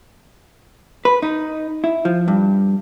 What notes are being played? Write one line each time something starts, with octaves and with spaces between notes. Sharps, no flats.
B4
D#4
E4
F3
G2